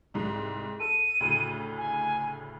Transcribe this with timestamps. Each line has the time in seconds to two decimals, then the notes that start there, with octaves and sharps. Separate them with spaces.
0.14 C2 G#2
0.80 A4 D#7
1.21 D2 A2 C#3
1.77 G#5